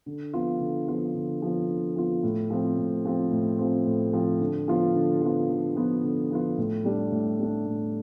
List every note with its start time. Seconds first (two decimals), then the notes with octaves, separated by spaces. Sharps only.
0.06 D3
0.34 F3 B3 F4
0.60 D3
0.88 F3 B3 F4
1.15 D3
1.42 F3 B3 F4
1.69 D3
1.96 F3 B3 F4
2.23 A2
2.50 F3 C4
2.78 A2
3.05 F3 C4
3.32 A2
3.58 F3 C4
3.86 A2
4.13 F3 C4
4.40 D3
4.68 F3 B3 F4
4.95 D3
5.21 F3 B3 F4
5.49 D3
5.76 F3 B3 F4
6.03 D3
6.31 F3 B3 F4
6.58 A2
6.85 G3 D4
7.12 A2
7.39 G3 D4
7.66 A2